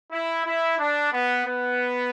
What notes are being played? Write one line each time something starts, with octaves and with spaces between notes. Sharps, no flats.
E4
E4
D4
B3
B3